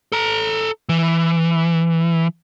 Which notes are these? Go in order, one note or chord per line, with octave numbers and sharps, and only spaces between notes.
A4 A#5
E3